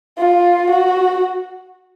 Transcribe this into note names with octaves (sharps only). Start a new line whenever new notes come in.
F4
F#4